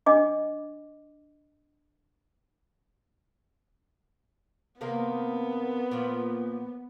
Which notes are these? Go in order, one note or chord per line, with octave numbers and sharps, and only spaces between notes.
D4 D#5 D6
C3 D#3 A#3 B3
A#2 F3